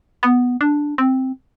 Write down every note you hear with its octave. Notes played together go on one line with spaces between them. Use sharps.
B3
D4
C4